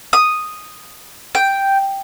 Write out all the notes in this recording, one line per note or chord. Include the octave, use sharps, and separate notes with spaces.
D#6
G5